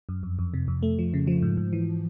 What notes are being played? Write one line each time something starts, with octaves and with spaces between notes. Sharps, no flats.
F#2
F2
F2
C3
F2
A3
F3
C#3
F3
G#2
G#2
E3